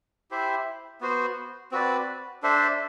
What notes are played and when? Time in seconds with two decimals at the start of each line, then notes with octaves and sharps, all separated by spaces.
0.31 E4 G4 C5 E5
1.01 B3 F#4 C5
1.72 C4 F#4 B4 D5
2.43 D4 A4 C5 E5